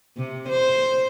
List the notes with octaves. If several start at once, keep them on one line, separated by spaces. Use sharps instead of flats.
C3
C5